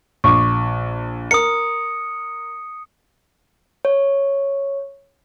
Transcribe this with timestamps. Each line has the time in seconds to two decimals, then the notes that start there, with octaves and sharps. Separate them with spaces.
0.24 A#1 C#6 D6
1.31 A#4 D#6 C#7
3.85 C#5